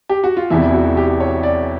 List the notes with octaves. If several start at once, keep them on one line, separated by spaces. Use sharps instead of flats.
G4
F#4
F4
E1 E2 C3 E3 E4
F#4
G4
C#5
D5